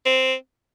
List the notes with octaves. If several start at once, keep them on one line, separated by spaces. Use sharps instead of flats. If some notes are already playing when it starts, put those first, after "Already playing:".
C4